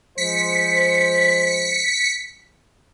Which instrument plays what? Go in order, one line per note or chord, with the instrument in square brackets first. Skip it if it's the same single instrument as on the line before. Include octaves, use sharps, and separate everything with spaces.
[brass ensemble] F3 G#3 C5 [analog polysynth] B6 C#7